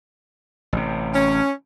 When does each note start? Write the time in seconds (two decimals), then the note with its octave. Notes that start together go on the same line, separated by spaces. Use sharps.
0.73 A1 C3
1.14 C#4